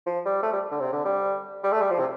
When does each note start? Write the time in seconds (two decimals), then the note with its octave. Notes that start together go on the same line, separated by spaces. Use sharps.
0.06 F3
0.25 G3
0.43 A3
0.53 G3
0.71 D3
0.80 C3
0.92 D3
1.05 G3
1.63 G3
1.72 A3
1.81 G3
1.91 F3
1.99 C3